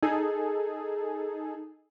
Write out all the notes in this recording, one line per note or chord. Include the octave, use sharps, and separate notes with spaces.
D#4 G#4 A4